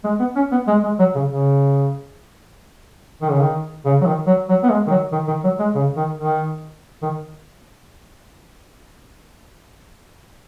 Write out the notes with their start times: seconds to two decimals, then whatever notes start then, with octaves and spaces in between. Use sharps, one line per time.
0.04 G#3
0.20 B3
0.36 C#4
0.52 B3
0.67 G#3
0.83 G#3
0.99 F#3
1.15 C#3
1.31 C#3
3.22 D#3
3.31 C#3
3.41 D#3
3.85 C#3
4.01 F#3
4.06 D#3
4.27 F#3
4.49 F#3
4.63 B3
4.70 G#3
4.87 D#3
4.90 F#3
5.12 D#3
5.27 D#3
5.44 F#3
5.59 G#3
5.75 C#3
5.96 D#3
6.17 D#3
7.03 D#3